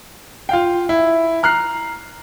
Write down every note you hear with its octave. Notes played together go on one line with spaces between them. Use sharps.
F4 F5 G5
E4
A#5 F6 F#6 C7